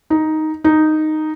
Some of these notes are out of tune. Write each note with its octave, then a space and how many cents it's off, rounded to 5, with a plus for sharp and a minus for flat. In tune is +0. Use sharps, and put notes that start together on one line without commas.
D#4 +5
D#4 -5